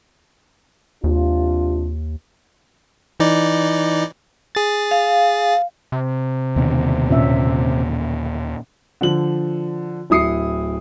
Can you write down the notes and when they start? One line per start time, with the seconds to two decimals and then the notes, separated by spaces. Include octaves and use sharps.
1.04 D#2 C3 D4 F4
3.20 E3 D#4 D5
4.55 G#4 A6
4.91 F5
5.92 C3
6.56 D#2 B2 D3
7.10 A#2 C#4 E5
9.01 D3 F3 F#7
10.10 D1 E4 D#6 C7 C#7